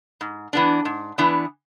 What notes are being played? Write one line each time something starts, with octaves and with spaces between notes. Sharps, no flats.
G#2
E3 B3 D4
G#2
E3 B3 D4